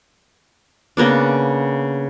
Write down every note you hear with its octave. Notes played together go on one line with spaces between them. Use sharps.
C#3 A#3 B3 D4